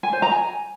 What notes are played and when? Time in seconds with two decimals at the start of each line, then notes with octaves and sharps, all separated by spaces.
0.03 G#5
0.13 C5
0.22 A#5
0.32 G#5